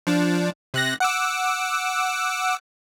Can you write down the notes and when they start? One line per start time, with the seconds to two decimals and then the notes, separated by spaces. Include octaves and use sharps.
0.07 F3 D4
0.74 C3 F#6 A#6
1.00 F#5 D6 E6